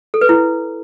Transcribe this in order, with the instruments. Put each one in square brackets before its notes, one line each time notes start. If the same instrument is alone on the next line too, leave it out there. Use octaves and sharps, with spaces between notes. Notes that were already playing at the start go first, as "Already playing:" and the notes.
[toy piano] A4
B4
E4